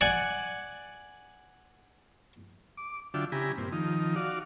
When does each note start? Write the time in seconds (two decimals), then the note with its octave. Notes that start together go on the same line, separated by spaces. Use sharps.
0.01 D5 F#5 G#5
2.77 D6
3.14 D3 F#3 D4 F4 E5 G5
3.32 C#3 E4 G4 G#5 A#5 B5
3.58 G2 A#2 C4
3.72 D#3 F3 D#4
4.16 F#4 D5 F5